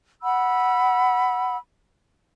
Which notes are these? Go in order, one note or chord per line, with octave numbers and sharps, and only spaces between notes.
F#5 B5 E6